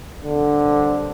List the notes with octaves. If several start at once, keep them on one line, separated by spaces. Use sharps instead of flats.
A#2 D3 G3 C4